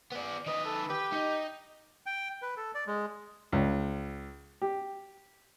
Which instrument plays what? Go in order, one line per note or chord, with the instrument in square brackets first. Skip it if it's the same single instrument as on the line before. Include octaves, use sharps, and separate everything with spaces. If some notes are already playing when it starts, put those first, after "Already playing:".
[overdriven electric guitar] B3 D5
[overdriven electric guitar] D#3 B4 [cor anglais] D#5
[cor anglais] A4
[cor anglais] G4 [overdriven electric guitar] B4
[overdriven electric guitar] D#4
[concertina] G5
B4
A4
D5
G#3
[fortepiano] C#2
G4